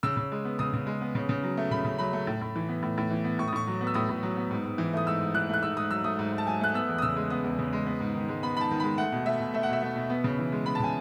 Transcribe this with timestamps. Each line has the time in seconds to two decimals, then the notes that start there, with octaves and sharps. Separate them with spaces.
0.03 C#3 E6
0.17 C#3
0.32 G#3
0.45 B3
0.59 C#3 D#6
0.73 C#3
0.87 G#3
1.01 B3
1.15 C#3
1.29 C#3
1.43 F#3
1.57 A3
1.71 C#3 B5
1.85 C#3
1.98 F#3 B5
2.13 A3
2.27 A2
2.41 A2
2.56 E3
2.69 B3
2.83 A2
2.98 A2
3.11 E3
3.24 B3
3.39 A2 C#6
3.48 D#6
3.53 A2 C#6
3.67 F#3
3.81 B3
3.87 E6
3.94 A2 D#6
4.09 A2
4.23 F#3
4.37 B3
4.51 G#2
4.65 G#2
4.78 E3
4.93 A3 D#6
5.07 G#2 E6
5.21 G#2
5.35 E3 F#6
5.49 A3 F#6
5.63 G#2 E6
5.76 G#2 D#6
5.91 F#3 E6
6.04 A3 D#6
6.19 G#2
6.32 G#2
6.38 A5
6.47 F#3 G#5
6.61 A3 F#6
6.74 B3 E6
6.88 E2
6.98 D#6
7.02 C#3 E6
7.16 G#3
7.30 B3 D#6
7.44 E2
7.59 C#3
7.73 G#3
7.86 B3
8.00 G#2
8.15 D#3
8.29 G#3
8.43 B3 B5
8.57 G#2 B5
8.61 A5
8.71 D#3
8.80 G#3 B5
8.98 A3 F#5
9.12 B2
9.26 A3 E5
9.40 B2
9.54 A3 E5
9.63 F#5
9.69 B2 E5
9.83 A3
9.96 B2
10.10 B3
10.24 C#3
10.39 E3
10.52 G#3
10.66 B3 B5
10.75 A5
10.80 C#3 G#5